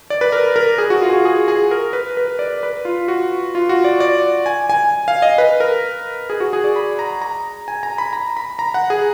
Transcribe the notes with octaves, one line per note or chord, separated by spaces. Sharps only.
D5
B4
A#4
A#4
G#4
F#4
F4
G#4
F#4
G#4
G#4
A#4
B4
B4
D5
B4
F4
F#4
F4
F#4
D5
D5
G#5
G#5
F5
D#5
B4
A#4
G#4
F#4
G#4
D5
B5
A#5
A#5
G#5
A#5
B5
A#5
B5
A#5
F#5
G#4